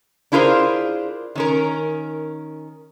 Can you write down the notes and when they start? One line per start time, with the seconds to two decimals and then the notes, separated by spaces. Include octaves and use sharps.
0.32 D4 E4 F4 G#4 A#4 C5
1.35 D#3 C#4 A#4